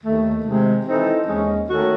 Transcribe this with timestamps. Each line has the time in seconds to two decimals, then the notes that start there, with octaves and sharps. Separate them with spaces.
0.02 D#2 D#3 A3
0.43 C3 D#3 G#3
0.85 E3 C4 D#4 A4
1.26 D#2 D#3 G#3 C#4
1.68 D#3 A3 C#4 F#4 A4